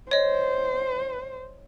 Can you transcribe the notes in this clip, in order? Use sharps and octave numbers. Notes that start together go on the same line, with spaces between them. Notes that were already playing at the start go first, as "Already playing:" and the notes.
C5 C#5 D#5